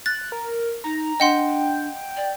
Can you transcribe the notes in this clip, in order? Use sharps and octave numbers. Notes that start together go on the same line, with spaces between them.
F#6 A6
A#4
D#4 A#5
D4 D#5 F#5 G5 C6
D5